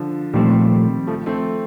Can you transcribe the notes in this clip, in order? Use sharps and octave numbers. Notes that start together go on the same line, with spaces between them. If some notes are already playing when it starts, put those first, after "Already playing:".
Already playing: D3 F3
A#2 D#3 F3 G3 A3 C4
F3 A3
A3 C4